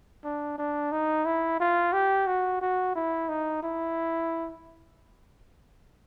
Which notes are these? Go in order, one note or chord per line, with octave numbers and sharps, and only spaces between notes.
D4
D4
D#4
E4
F4
G4
F#4
F#4
E4
D#4
E4